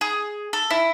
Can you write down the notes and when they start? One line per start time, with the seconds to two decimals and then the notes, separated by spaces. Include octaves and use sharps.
0.01 G#4
0.53 A4
0.70 E4